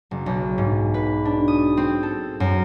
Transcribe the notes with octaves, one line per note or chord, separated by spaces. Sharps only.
F#1
B1
G#2
B4
D4
D#6
C4
A4
F#2